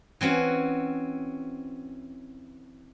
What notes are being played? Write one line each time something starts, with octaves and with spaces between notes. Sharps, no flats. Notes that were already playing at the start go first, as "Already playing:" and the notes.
E3 C4 C#4 F#4